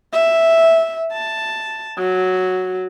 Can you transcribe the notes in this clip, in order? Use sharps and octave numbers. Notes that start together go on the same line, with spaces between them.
E5
A5
F#3